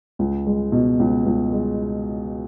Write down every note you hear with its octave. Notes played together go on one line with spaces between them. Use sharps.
C#2
G#3
B2
C#2
C#2
G#3